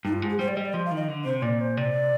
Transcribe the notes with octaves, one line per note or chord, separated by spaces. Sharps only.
G2 D#4
F4
G#2
G#4
G3 C5
D5
G3 D#5
D5
F3 D#5
F5
D#3 D#5
D3
C3 C5
A#2 D5
C5
C3 D5